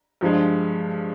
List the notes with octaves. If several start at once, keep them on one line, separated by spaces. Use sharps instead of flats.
G2 F3 G#3